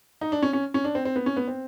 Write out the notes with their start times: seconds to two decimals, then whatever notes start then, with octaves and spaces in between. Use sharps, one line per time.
0.21 D#4
0.32 D4
0.43 C#4
0.53 C#4
0.74 C#4
0.84 D4
0.95 C4
1.05 C4
1.16 B3
1.26 C#4
1.36 B3
1.48 C4